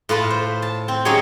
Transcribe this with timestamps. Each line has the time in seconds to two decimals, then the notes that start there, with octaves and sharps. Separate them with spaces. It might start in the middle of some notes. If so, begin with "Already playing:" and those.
0.09 A2 F4 B4 A5
0.30 C5
0.62 A5
0.88 C4
1.05 F#3 C#4 D#4 G4 G#4 C#5